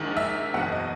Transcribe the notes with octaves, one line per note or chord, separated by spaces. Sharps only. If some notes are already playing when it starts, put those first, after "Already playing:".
Already playing: A#1 G#2 D#3
E5
F#1 E2 B2 F#5
D#5